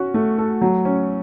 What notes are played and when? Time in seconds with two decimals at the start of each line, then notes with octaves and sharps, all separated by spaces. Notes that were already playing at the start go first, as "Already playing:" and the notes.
Already playing: C#4 F#4
0.14 A3
0.38 A4
0.61 F#3
0.85 C#4